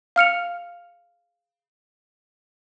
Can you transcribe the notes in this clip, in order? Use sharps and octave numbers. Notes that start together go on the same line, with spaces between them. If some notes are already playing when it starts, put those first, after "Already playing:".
F5 F6 C#7 F7